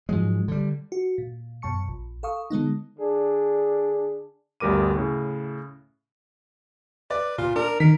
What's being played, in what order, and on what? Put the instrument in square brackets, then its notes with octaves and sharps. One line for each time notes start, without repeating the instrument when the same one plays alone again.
[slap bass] G#2 F3 F#3 G#3
D3 G3
[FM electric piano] F#4
A#2
F#2 B2 A5 C#6 C#7
A#1
A4 F5 C#6 D#6
D3 G#3 B3 D#4
[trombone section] D3 D4 G#4
[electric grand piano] G1 D2 G3 A#4 D6 D#7
A2 C#3
[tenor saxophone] B4 [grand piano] D5
[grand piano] A#2 [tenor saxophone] F4
[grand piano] D4 [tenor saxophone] A#4
[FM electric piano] D#3 [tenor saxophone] A#4 [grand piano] B6